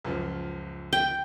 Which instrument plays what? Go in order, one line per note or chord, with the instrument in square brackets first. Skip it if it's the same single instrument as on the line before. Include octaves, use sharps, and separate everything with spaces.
[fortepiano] C#2 F#2 F3
[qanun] G5